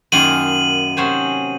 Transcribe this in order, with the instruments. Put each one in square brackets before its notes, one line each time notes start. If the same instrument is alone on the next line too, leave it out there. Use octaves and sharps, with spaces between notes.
[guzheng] F#2 D#3 A#3 F4 G#4 [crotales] D#7 F#7
[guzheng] C3 F#3 C#4 G#4 C5